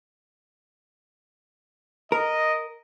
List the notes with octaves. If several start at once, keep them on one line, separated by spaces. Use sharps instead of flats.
A#4 D#5